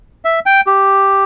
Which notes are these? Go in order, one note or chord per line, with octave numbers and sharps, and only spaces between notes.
E5
G5
G4